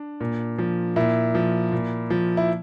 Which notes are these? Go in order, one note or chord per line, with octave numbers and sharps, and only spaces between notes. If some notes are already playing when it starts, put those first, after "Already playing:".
Already playing: D4
A#2
F3
A#2 E4
F3
A#2
F3
E4